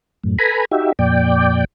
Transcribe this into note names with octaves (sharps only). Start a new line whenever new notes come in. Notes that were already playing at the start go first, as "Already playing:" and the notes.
F#2 A2
A4 B4 G#5 A#5 B5
D#4 F#4 G4 E5
F2 A#2 D5 G5